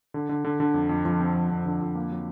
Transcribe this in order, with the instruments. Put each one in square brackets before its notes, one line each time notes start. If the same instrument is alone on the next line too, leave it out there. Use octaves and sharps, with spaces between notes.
[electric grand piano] D3
D3
D3
D3
F2
F2
[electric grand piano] F2 [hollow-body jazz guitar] F3
[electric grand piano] C4
F2
F2
D3
F2
A#3
F#3